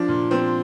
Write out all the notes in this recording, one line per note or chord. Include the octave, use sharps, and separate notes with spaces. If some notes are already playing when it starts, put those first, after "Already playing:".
Already playing: F3 D4
A#2
F3 C4